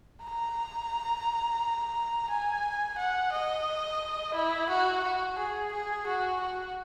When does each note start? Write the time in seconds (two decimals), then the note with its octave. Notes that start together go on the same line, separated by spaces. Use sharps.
0.23 A#5
2.30 G#5
2.98 F#5
3.33 D#5
4.35 E4
4.70 F#4
5.04 F#4
5.39 G#4
5.72 G#4
6.07 F#4
6.41 F#4